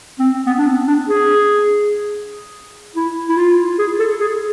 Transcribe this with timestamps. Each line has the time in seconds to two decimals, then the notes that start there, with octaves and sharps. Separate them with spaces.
0.19 C4
0.46 B3
0.58 D4
0.67 C4
0.87 D4
1.09 G#4
2.96 E4
3.29 E4
3.37 F4
3.78 G#4
3.99 A4
4.20 G#4